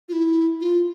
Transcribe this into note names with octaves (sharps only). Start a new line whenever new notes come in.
F4
E4
F4